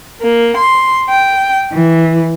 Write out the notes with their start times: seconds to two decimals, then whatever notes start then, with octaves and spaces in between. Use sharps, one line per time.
0.21 A#3
0.57 C6
1.08 G5
1.72 E3